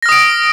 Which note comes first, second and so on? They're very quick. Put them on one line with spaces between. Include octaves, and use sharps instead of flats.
A#6 F6 D#6 D7